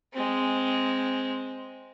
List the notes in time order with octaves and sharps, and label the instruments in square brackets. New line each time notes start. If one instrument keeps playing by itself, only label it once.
[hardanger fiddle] G#3 C4